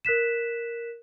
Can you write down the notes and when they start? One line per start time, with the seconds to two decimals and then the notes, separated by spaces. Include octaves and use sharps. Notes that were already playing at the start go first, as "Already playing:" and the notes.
0.05 A#4 F#6 B6 E7